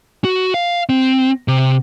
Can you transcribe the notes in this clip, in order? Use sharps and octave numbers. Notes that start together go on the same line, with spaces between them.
F#4
F5
C4
C3